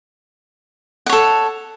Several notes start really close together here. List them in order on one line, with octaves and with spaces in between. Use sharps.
F#5 C#5 A4